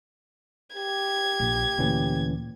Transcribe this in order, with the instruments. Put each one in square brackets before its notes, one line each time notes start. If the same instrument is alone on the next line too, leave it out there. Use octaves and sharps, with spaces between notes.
[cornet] G4 [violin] G#6
[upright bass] A#1
[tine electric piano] D2 E3 C#4 [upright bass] A#2